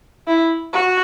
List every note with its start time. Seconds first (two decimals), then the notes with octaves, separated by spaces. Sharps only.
0.27 E4
0.73 F#4